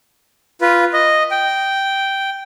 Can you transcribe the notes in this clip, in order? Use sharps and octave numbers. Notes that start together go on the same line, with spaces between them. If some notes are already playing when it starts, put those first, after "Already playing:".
F4 B4
D#5
G5